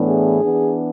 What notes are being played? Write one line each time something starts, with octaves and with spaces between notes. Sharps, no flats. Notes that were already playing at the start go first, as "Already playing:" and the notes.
Already playing: A2 E3 B3 D4
G#4
E3 B3 D4